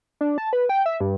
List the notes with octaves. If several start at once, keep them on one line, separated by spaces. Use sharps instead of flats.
D4
A5
B4
G5
E5
G2